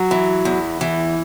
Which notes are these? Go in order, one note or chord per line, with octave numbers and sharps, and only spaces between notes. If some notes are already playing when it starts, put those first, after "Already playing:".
Already playing: F#3
E3
E2
E3